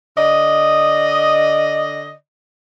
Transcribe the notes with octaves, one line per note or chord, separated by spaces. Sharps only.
D3 D5 D#5